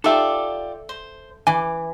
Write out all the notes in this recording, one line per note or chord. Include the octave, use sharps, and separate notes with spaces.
D#4 F4 G4 A4 D5 E5
C5
E3 G#5 D6